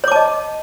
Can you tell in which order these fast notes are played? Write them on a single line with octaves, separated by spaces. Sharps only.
C#5 D6 A5 D#5